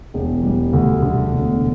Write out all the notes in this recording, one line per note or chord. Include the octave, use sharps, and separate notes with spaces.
E1
G3
D2
D3
E1